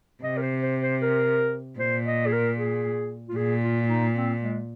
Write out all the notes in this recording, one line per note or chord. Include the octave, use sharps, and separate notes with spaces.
C3 D#5
A#4
C5
C5
C5
A#4
A#2 C5
D#5
G#4
A#4
G#4
F4
A#2 G#4
F4
D#4
C4
G#3